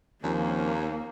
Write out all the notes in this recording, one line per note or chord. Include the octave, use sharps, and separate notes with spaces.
D#2 F3 A#3 C4 C#4